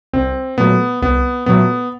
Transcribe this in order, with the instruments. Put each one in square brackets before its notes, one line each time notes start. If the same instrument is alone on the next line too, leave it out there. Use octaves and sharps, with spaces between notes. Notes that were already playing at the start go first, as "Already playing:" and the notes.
[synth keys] C2 [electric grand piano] C4
[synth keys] A#2 F#3 A3 [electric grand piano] B3
[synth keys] C2 [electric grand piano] B3
[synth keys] A#2 F#3 A3 [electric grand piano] B3